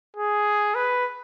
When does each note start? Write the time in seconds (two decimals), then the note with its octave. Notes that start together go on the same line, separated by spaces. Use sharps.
0.17 G#4
0.75 B4